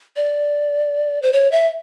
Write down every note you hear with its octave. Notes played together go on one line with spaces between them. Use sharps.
D5
C5
C#5
E5